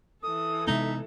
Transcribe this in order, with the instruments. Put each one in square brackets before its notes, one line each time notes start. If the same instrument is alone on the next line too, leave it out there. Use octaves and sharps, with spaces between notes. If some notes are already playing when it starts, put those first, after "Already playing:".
[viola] E3 A4 [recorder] D#6
[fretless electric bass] C3 G#3 B3 [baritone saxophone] D#4 [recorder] E5